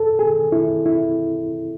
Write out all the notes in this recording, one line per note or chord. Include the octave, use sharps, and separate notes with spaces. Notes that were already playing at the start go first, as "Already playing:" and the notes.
Already playing: A4
G#4
E4
E4